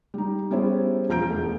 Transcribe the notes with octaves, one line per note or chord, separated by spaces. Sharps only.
G3 D#4
G3 B3 C#4 E4 G#4 C5
E1 F3 A#5 G6 D7
E2 D3 A3